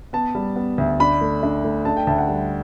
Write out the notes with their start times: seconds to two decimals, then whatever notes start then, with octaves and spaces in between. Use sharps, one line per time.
0.13 B3 A5
0.35 G3
0.56 B3
0.78 D2
1.00 D4 B5
1.21 A3
1.43 D4
1.64 A3
1.85 D4 A5
1.97 G5
2.07 D2 A5
2.18 F#5
2.29 G3